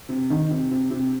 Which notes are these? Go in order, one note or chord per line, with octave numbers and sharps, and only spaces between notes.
C3
D#3
C3
C3
C3